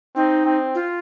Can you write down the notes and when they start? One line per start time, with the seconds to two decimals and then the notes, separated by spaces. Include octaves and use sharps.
0.15 C4 D#4
0.45 C4
0.75 F4